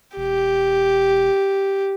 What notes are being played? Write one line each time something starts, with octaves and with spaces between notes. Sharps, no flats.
E1 G4